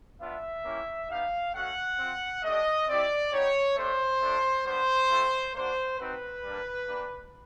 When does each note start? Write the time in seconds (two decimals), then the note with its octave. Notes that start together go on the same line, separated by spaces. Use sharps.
0.20 B3 D4 F4 E5
0.64 A#3 C#4 E4 G4
1.09 B3 D#4 G4 F5
1.54 A3 C#4 F#4 F#5
1.98 C4 F4
2.43 A3 D4 G4 D#5
2.87 C4 E4 G4 D5
3.31 B3 D#4 G4 C#5
3.76 A3 D4 G4 C5
4.21 A3 D4 F4
4.65 G3 B3 D4 C5
5.10 A3 C4 F4
5.54 A#3 D4 F#4 C5
5.99 C4 D#4 F#4 B4
6.43 G3 A#3 D4
6.87 A#3 D4 G4